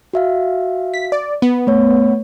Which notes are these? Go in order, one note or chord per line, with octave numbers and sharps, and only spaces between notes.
F#4 E5 F5
B6
D5
B3
A3 C#5